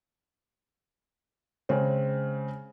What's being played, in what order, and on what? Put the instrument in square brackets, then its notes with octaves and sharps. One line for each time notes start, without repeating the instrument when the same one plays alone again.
[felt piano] C#3 G#3 C4